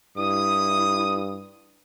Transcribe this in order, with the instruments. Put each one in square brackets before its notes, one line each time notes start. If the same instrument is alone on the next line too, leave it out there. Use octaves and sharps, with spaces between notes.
[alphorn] G2 [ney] E4 [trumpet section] D#6